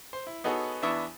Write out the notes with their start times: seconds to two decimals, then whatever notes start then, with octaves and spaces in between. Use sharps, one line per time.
0.13 C5
0.27 E4
0.44 B3 D#4 F#4 G#4 A4 C#5
0.82 E2 B3 D4 E5 C#6 D#6